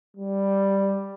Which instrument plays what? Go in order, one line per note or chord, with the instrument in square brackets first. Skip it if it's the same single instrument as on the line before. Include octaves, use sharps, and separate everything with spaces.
[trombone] G3